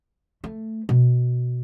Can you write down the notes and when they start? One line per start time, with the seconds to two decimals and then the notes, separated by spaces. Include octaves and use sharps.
0.44 A3
0.89 B2